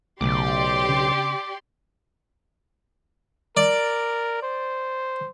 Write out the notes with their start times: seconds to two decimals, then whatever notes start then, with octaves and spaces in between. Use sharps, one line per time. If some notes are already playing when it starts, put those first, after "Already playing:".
0.21 B1 C#3 A3 G4 D5 C6 D6
0.89 C#3 B3 D4
3.57 A#4 D5
4.43 C5